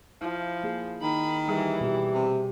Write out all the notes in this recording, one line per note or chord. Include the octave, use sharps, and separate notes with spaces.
F3 E4
A#3 G#4
D#3 B5
E3 G3 G#4
B2 G4
C3